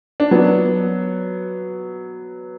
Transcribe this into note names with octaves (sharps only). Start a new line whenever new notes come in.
D4
F#3 B3